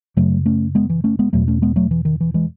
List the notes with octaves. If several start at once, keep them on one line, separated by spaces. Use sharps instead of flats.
F#2 C#3 F#3 A3
A3 C#4
G#3 B3
E3
A3 C#4
G#3 B3
E2 B2 F#3 A3
A3 C#4
G#3 B3
F#3 A3
E3
D#3
E3
E3 G#3